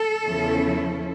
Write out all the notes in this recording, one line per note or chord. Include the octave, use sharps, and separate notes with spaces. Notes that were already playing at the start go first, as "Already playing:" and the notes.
Already playing: A4
E2 C#3 F3 C#4 E4